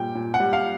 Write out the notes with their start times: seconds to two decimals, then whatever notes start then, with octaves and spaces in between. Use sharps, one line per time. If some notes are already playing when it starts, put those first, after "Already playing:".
Already playing: A#2 G3 G5
0.15 A#2
0.34 F#5
0.40 G3
0.53 F5